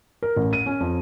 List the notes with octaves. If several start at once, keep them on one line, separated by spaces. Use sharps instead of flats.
A#4
A1
D#7
C#4
F2